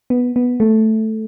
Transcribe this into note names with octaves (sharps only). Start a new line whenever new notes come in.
B3
B3
A3